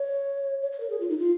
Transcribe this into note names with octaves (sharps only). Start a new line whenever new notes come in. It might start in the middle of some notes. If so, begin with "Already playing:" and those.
Already playing: C#5
C#5
C#5
A#4
G#4
F4
D#4
F4